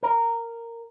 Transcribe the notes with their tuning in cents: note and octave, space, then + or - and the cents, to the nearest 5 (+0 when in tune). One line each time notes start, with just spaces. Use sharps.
A#4 -10